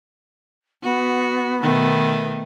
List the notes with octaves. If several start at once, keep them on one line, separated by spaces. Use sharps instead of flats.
B3 F#4
B2 D#3 A3